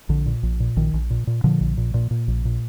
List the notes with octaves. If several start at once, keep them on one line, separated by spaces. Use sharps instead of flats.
A#1 D3
A#2
A#1
A#2
A#1 D#3
A#1
A#2
A#2
A#2 D3 F3
A#1
A#2
A#2
A#2
A#1
A#2